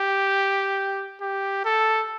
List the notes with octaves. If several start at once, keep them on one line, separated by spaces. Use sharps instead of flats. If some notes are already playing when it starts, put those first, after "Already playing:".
Already playing: G4
G4
A4